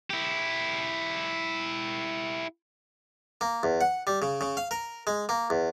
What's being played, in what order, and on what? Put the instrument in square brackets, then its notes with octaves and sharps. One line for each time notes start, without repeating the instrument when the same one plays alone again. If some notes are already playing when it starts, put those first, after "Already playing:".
[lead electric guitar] E4 G4
[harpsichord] A#3
E2
F#5
G3
C#3
C#3
F5
A#4
G#3
A#3
E2